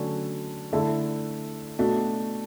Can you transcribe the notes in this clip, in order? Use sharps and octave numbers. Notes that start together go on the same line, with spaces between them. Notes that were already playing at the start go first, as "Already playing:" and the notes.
Already playing: D3 F#3 A3 C#4
D3 A3 E4 A4
B2 A3 D4 F#4